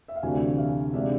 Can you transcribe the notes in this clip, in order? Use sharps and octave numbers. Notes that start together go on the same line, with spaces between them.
E5
F5
D2 C3 E3 A3 D4 G#5
F5
C3 G#3 D4 E5